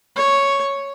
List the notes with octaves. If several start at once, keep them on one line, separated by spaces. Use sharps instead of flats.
C#5